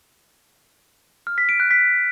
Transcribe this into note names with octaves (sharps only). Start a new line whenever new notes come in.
F6
B6
D7
F#6
B6